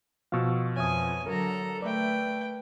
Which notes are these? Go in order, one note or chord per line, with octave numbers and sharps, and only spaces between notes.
B2 F3 F5 C#6 E6
F2 B3 C#5 E5 G#5 D#6
D3 F#3 A4 A#4 A#5
A3 B4 D5 E5 G5